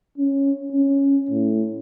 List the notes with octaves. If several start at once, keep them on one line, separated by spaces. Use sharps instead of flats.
C#4
C#4
A2